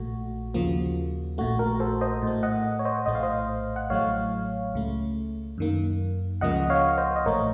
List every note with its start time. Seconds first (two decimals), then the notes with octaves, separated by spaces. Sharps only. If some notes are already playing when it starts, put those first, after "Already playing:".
Already playing: A#1 A#2 A3 F#4
0.54 D#2 C#3 F3 A#3
1.38 A#1 A#2 A3 F#4
1.59 F#4 A#4
1.80 A4 C5
2.01 C5 D#5
2.22 A2 A3
2.43 D#5 F#5
2.79 C#5
2.85 C5 D#5
3.06 A#1 A2 A3 D#5
3.15 F5
3.23 C5 D#5
3.76 F#5
3.90 A1 A2 F#3 A3 C#5 F5
4.74 C#2 C#3 A3
5.58 F#2 D#3 A#3
6.41 C#2 C#3 F3 A#3 D#5 F#5
6.70 C#5 F5
6.98 C5 D#5
7.16 D#5
7.26 A1 A2 A3 A#4 C#5